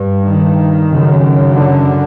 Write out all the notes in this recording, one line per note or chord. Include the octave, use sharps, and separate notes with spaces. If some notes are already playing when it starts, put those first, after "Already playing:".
Already playing: G2
D#3
F#2 C#3
D3